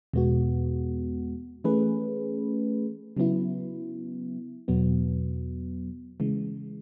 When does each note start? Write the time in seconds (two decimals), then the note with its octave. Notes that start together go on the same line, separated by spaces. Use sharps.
0.13 E2 B2 G#3 B3 F#4
1.64 E3 A3 C#4 G#4 B4
3.17 C#3 F#3 B3 E4
4.68 E2 B2 F#3 B3
6.20 C#3 E3 G#3